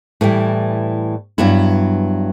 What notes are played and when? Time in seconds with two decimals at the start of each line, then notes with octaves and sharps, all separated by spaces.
0.21 A2 E3 G3
1.38 G2 F#3 B3 E4